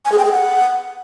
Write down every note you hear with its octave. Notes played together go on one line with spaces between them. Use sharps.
G#5
G#4
G5
G#4
F#5